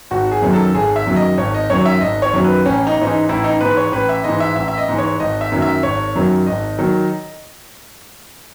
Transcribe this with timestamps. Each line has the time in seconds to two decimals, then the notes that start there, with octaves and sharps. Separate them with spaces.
0.11 G#1 F#4
0.31 G#4
0.42 F#2 D#3 F#3
0.53 A4
0.74 G#1 G#4
0.96 E5
1.06 F#2 D#3 F#3
1.16 D#5
1.38 G#1 C#5
1.54 D#5
1.70 F#2 D#3 F#3 C#5
1.85 E5
2.01 G#1 D#5
2.22 C#5
2.34 F#2 D#3 F#3
2.44 B4
2.66 A1 C#4
2.87 D#4
2.97 G#2 E3 C#4
3.07 D#4
3.29 A1 E4
3.44 D#4
3.61 G#2 E3 B4
3.77 C#5
3.92 A1 B4
4.09 E5
4.24 G#2 E3 D#5
4.40 E5
4.56 A1 E5
4.68 E5
4.78 D#5
4.89 G#2 E3
4.99 C#5
5.20 G#1 D#5
5.41 E5
5.52 F#2 D#3 F#3
5.62 E5
5.83 G#1 C#5
6.15 F#2 D#3 F#3
6.46 G#1 D#5
6.79 D#3 F#3